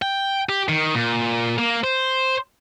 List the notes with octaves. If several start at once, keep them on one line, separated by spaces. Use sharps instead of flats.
G5
G4
D#3
A#2
A#3
C5